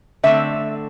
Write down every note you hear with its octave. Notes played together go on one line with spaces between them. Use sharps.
D3 A3 C4 E5